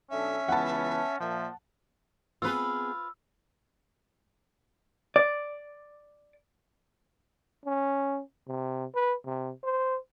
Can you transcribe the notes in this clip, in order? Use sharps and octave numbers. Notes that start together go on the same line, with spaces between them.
B1 C#4 D4 A4 E5
C#2 E3 B3 F#5 A5
A#2 F3 E5
B3 C4 F4 G#4 B4 E6
D5
C#4
C3
B4
C3
C5